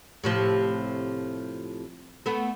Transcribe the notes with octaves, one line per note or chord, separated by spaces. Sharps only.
A2 C3 F3
A3 B3